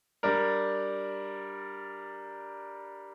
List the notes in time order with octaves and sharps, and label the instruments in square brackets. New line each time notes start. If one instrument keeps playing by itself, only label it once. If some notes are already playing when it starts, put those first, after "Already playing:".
[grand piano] G3 D4 A#4